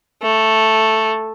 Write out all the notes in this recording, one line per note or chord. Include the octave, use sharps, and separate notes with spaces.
A3